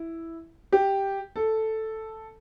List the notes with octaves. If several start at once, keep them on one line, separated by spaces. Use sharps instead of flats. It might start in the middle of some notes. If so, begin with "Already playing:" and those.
Already playing: E4
G4
A4